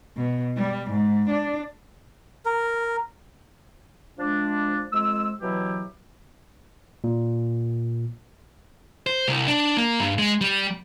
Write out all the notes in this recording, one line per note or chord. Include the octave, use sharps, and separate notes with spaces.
B2
G3
G#2
D4
A#4
F3 G#3 D4
F2 G#3 E6
B2 E3 F#3 E4 G4
A#2
C5
C2
D4
A#3
G2
G#3
G3